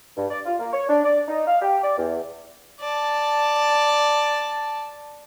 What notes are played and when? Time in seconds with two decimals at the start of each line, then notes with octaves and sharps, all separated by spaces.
0.17 G2
0.31 D5
0.45 F4
0.59 A#3
0.73 C#5
0.89 D4
1.04 D5
1.28 D#4
1.47 F5
1.62 G4
1.83 D5
1.97 E2
2.80 D5 A5